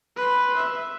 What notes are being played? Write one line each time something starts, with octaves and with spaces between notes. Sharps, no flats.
B4 C6
E5